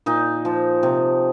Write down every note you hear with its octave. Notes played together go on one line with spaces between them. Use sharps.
A#2 D#4
F3
C3